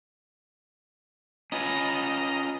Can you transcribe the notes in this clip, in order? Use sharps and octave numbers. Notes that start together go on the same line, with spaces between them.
C#4 F4 B4 D#5 A#5